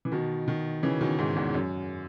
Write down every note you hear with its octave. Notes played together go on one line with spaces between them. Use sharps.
E3
B2 D#3
B2 D#3
C#3 E3
B2 D#3
G#2 B2
E2 G#2
F#2